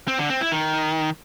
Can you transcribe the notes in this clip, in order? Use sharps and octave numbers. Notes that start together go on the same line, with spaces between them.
C4
D3
C4
E4
D#3